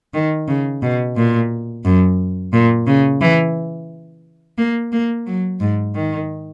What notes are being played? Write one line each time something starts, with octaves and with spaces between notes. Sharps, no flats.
D#3
C#3
B2
A#2
F#2
A#2
C#3
E3
A#3
A#3
F#3
G#2
D#3